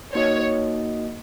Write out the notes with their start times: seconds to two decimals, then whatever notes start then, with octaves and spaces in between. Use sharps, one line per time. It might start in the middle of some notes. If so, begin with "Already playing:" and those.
0.14 A#3 D#4 F#4 C#5 D#5